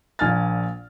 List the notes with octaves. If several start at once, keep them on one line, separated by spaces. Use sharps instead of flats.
A#1 A#2 G#5 F6 A6